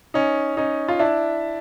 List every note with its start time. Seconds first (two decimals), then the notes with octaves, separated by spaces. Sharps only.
0.14 C#4 D#4
0.57 C#4 D#4
0.88 F4
0.99 D4 E4